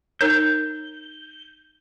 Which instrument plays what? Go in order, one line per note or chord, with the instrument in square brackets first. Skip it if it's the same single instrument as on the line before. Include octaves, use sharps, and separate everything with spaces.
[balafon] D#4 A#4 C#5 [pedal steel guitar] G6